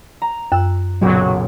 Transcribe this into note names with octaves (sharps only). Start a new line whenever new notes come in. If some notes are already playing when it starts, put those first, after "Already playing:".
A#5
F#2 E6 F#6
F#1 B1 A#2 F#3